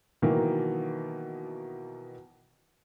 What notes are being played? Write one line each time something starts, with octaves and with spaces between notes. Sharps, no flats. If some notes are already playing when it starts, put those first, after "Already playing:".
B2 D#3 E3 F#3 A#3